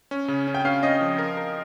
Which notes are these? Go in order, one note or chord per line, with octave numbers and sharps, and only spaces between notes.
C#4
C#3
C#4
G5
C#4 F5
C#4 D#5
F3
A#4
A#4